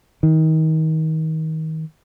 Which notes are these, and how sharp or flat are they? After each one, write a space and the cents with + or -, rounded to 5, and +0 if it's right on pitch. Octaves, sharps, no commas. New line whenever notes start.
D#3 +30